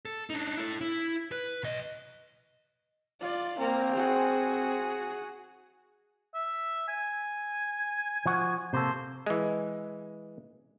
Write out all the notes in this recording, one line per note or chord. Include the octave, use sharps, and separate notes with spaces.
A4
D4 D#4
E4 A4
E4
B4
B1 D#5
F4 D5
A#3 C4 A#4
F#4 G#4
E5
G#5
F3 F#4
C3 A#3 A4 C5
E3 G#3